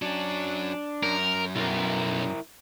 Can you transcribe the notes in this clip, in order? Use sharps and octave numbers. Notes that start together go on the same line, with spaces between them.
F#3 C#4 D4
F#2 A#4
B1 E4 A#4